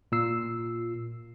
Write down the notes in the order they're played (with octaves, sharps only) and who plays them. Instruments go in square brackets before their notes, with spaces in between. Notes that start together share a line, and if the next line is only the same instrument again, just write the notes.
[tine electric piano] A#2 F4 E6 C7